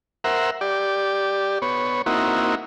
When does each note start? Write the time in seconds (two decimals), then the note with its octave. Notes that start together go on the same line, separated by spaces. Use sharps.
0.24 A#4 C5 E5 F#5
0.61 G4 D5
1.62 B3 C#5
2.06 A#3 C4 D#4 E4 F#4